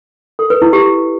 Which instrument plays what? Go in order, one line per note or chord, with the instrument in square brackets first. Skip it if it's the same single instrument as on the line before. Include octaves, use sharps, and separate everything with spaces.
[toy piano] A4
B4
E4
G4